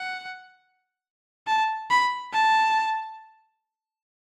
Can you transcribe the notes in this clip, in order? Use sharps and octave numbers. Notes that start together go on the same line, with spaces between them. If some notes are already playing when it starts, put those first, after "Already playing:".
Already playing: F#5
A5
B5
A5